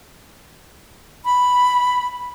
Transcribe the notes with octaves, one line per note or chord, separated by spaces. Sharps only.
B5